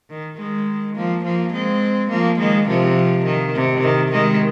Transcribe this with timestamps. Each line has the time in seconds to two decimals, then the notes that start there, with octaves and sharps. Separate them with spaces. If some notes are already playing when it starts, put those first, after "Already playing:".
0.10 D#3
0.37 D#3 G#3
0.96 F3 A#3
1.24 F3 A#3
1.52 G#3 C4
2.10 F3 A#3
2.39 D#3 G#3
2.68 C3 F3
3.25 D#3
3.55 C3
3.83 D#3
4.11 D#3 G#3